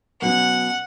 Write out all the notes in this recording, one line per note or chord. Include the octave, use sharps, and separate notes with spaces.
B2 F#3 C#4 F#5